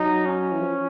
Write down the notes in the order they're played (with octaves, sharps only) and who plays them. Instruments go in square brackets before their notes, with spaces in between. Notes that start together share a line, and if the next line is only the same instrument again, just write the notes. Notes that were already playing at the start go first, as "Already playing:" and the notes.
Already playing: [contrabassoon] F#3 [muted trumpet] D#4
[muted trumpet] C#4
[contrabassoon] E3
F3